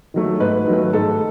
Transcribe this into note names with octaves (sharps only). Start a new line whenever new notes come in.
D#3 F#3 A3
G#2 B4
D#3 F#3 A3
G#2 A4